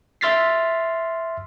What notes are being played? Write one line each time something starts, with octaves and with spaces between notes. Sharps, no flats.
E5 C6 F6 A6 B6 C7